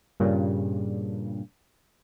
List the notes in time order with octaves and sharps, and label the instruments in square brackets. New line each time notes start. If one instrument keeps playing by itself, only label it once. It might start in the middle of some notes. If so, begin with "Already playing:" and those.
[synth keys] G2 A#2 C#3